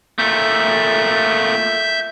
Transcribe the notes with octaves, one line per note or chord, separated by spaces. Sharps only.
A#2 A3 E5 G6